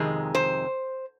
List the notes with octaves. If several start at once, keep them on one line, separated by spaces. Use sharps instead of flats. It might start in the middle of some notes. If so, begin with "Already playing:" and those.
Already playing: F2 C3 D#3 G#3
C5